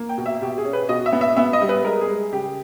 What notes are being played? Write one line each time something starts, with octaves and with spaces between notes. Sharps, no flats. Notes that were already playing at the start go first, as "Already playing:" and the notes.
Already playing: A#3
G5
B2
E5
B2 G4
G#4
C#4
B4
B2 D#5
E5
B3
E5
B3 E5
D#5
G3
B4
G#3 A#4
G#4
G#3
C#3 G4